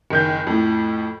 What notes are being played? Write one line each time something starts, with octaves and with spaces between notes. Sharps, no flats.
F#1 D#3 G6
F2 A2